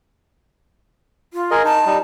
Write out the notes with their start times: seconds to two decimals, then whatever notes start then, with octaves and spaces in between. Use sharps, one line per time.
1.33 F4
1.51 G#4 A#4 D#5
1.64 D#4 A5
1.86 G3 D#4